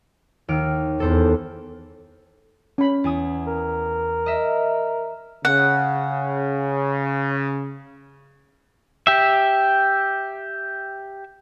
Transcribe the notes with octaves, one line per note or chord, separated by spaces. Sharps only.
D#2 F6 D7
E2 A4 C5
C#4 B5
E2 G#5 D#6
A#4
D#5 E5
C#3 F#5
G4 E5